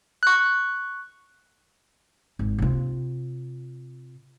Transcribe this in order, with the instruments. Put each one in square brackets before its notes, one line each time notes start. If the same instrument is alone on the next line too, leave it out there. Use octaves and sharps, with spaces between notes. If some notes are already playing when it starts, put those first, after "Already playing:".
[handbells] C#6 F#6
[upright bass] G#1
C3 F4